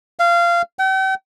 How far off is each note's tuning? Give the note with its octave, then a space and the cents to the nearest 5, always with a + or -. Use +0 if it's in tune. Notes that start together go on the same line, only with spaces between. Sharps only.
F5 -20
G5 -45